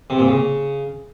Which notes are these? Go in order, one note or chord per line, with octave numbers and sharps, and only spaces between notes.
C3
A#2
C#3